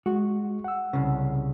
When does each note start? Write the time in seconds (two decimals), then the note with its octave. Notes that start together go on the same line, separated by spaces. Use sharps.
0.06 G#3 F#4
0.64 F#5 E6
0.93 C2 C#3